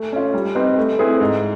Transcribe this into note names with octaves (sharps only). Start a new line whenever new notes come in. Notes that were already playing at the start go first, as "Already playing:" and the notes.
Already playing: A3
C#4 F4
G3
C4 D#4 G4 B4
A3
C4 E4 G#4 B4
G#2